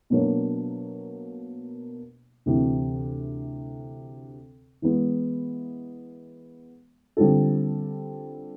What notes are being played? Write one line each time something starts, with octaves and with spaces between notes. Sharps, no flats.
B2 F#3 A#3 D4
D2 C3 E3
E3 G#3 B3
D3 G3 C4 F4 A4